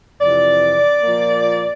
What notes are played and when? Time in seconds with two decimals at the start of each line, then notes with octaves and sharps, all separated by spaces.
0.21 F2 C3 E3 D5
1.02 A#2 F3 A#3